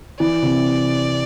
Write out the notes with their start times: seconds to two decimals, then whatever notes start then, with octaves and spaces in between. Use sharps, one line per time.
0.20 E3 D5
0.43 C3